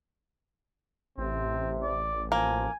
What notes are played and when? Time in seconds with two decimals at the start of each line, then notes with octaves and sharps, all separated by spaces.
1.18 A1 C3 C4
1.82 D5
2.32 F3 A#3 G#5